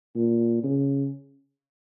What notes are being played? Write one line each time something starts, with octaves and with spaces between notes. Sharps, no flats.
A#2
C#3